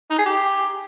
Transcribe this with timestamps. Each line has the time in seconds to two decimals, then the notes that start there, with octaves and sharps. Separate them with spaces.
0.11 D#4
0.18 G#4
0.26 G4